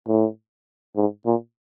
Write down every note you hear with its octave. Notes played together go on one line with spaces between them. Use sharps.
A2
G#2
A#2